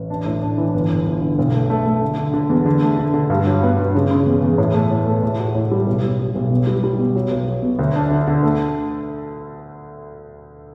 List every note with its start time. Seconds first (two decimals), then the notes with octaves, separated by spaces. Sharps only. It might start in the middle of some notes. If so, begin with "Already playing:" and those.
Already playing: A1
0.10 D4
0.26 A2
0.42 D4
0.58 E3
0.74 G1
0.90 G1
1.06 G1
1.21 D3
1.39 B1
1.54 A3
1.70 A3
1.86 A3
2.02 D3
2.18 D3
2.34 D3
2.50 E2
2.66 D3
2.82 A3
2.99 D3
3.14 D3
3.30 G2
3.46 F#3
3.63 B3
3.79 G2
3.95 C#3
4.11 C#3
4.26 E2
4.43 E2
4.58 A2
4.74 A3
4.91 A2
5.06 A3
5.23 A2
5.39 F#4
5.55 A2
5.71 G3
5.87 B1
6.03 B1
6.19 G3
6.35 B1
6.50 B2
6.67 G3
6.84 G3
6.99 B2
7.16 F#3
7.31 B1
7.48 F#3
7.63 B2
7.79 D2
7.96 D4
8.11 D3
8.28 D3
8.43 A3